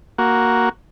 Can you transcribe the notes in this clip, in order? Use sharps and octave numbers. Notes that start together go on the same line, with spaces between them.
A#3 F#4